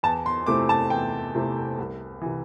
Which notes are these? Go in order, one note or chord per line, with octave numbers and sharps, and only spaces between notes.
E2 A5
C6
C3 A3 C4 E4 D6
A5
E2 G5
C3 A3 C4 E4
C2
C3 E3